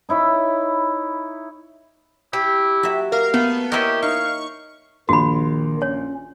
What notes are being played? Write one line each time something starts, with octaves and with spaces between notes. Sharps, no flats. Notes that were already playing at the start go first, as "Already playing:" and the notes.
D#4 E4 C#5 B5
E4 G4
F#3 E5
A#3 A#4 F5
A3 B3
E4 G4 A#4 C#5 D#5 E5
D#4 F5 C#6
A#1 D#3 F#4 B5 C6
C#4 C#5